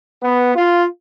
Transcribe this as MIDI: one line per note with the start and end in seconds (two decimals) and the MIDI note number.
0.22 0.53 59
0.55 0.84 65